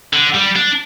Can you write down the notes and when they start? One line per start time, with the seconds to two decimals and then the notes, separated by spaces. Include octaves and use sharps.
0.13 D3
0.35 G3
0.56 D4